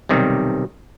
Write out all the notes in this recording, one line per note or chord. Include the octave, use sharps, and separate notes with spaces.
B1 C3 D#3 G3